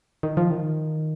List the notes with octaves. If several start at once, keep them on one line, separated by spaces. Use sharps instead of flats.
D#3
F3
D#3